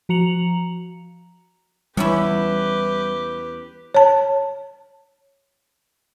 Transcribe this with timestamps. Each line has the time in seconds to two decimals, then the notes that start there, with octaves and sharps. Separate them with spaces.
0.09 F3 F#4 A#5 C#7 F7 F#7
1.97 E2 G3 C#4 E4 G4 B4
3.95 C#5 A5